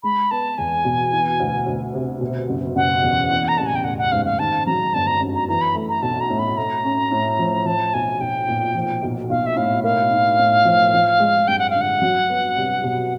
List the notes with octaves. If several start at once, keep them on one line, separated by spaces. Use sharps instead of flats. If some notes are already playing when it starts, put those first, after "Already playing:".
G#3 B5
B3 A5
E2 G#5
B2
E3
D2
D2
C3
B2
F#1
F#1 F#5
E2
E3
A#5
A1 A5
G#5
G5
A1 F#5
F#5
G#2 F5
F5
D#3 A5
F#3 A#5
G1 A5
A#5
F#2
A#5
E3 A#5
B5
A3
A#5
B1 A5
A#5
A2
B5
A3 A#5
C#4
A2
F3
F3 A5
B1 G#5
B1 G5
A#2
F3
B1
B1 F5
E5
A2 F5
A#3 F5
D#4
A2
F3
F3
G#3
G2 G5
F#5
D3 F5
F#5
F#3
B3
C2
B2